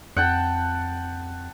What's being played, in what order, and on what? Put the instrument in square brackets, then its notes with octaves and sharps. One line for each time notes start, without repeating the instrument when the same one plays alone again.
[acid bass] F2 [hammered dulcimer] F#5 G5 A5